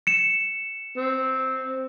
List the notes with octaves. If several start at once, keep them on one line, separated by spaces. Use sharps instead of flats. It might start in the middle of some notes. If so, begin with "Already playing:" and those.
C#7 E7
C4